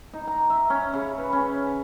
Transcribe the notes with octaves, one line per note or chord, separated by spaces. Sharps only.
D#4
A#5
E5
C#4
C#3
B4
C#4